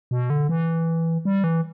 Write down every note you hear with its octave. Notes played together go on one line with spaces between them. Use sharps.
B2
D3
E3
G3
E3